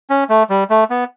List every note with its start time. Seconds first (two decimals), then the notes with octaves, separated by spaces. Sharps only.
0.10 C#4
0.29 A3
0.50 G3
0.70 A3
0.90 B3